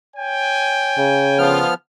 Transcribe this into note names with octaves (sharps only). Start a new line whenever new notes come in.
C#5 G5 G#5
C#3
D3 F3 B3 F4 F6